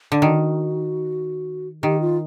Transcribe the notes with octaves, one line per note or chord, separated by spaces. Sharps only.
D3
D#3 F#4
D#3 G4
F4